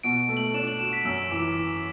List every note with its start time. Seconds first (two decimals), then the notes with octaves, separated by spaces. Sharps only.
0.03 B2 D7
0.29 A3
0.37 F#7
0.54 D4 E7
0.68 F#7
0.79 F#4 E7
0.93 B6
1.05 F#2 E6
1.31 E3 D6